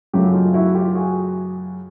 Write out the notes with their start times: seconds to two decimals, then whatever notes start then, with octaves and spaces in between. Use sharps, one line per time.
0.13 F#2 C#3 F#3 A3 F4 G4
0.34 D#4 F4
0.54 E4 F#4
0.75 F4 G4
0.95 F#4 G#4